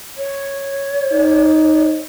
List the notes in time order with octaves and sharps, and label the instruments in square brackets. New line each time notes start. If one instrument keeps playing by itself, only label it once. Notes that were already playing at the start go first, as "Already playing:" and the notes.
[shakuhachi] C#5
[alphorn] D#4